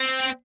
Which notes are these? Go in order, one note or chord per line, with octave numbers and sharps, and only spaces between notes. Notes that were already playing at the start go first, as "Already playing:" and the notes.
Already playing: C4